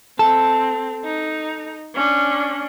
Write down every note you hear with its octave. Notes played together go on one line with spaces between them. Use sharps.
C4 A4
D#4
C#4 D4